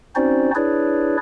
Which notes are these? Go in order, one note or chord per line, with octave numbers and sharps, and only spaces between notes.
C4 C#4 D#4 F#4 C5 D5
D4 E4 G#4 B4 C#5 D5